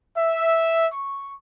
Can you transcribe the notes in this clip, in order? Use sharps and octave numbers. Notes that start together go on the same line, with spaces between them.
E5
C#6